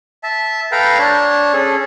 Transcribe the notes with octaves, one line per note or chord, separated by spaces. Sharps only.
E5 A5
A4 B4 F5 G5 A#5 B5
D4 C#5 A5
C#4 G#4 A4